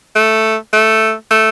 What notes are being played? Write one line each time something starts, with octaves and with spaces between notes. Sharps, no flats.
A3
A3
A3